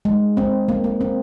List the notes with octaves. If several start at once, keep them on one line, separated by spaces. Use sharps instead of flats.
G#3
C4
A#3
A#3
C4